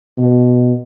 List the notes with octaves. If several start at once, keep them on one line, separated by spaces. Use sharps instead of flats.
B2